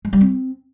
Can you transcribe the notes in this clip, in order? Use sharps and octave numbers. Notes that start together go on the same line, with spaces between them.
G#3
G3
C4